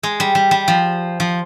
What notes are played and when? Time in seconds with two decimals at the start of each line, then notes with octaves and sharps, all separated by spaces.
0.03 G#3
0.20 G3
0.35 G3
0.51 G3
0.68 F3
1.20 F3